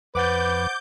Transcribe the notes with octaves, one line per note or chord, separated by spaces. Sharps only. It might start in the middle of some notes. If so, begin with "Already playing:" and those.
F2 B4 C5 F#5 D6 G6 A6